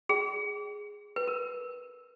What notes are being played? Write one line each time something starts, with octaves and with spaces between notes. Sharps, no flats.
G#4
B4
A#4